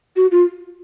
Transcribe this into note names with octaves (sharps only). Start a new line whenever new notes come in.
F#4
F4